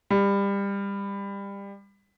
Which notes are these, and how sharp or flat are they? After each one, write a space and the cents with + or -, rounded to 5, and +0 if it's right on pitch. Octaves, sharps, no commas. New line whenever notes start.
G3 +25